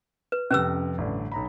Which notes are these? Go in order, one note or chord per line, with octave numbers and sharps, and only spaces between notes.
B4
F2 C3 C#4 B4 E6
A1 G2 D3
B1 A#5 B5